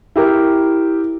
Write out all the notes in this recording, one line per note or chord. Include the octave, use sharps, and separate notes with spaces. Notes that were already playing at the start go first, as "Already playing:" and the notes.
E4 G4 A#4